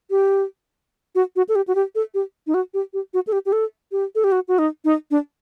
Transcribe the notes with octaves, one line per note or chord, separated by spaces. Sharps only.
G4
F#4
F#4
A4
G4
F#4
G4
A4
G4
D#4
F#4
G4
G4
F#4
A4
G4
G4
A4
G4
A4
G4
F#4
F#4
D#4
D#4
D4